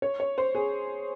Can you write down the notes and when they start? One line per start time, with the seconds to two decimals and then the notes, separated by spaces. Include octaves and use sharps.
0.02 C#5
0.20 C#5
0.38 C5
0.55 G#4